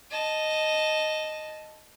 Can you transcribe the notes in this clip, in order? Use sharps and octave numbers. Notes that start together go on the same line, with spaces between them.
D#5 A5